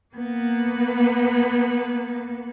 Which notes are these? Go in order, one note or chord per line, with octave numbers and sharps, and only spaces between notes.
A#3 B3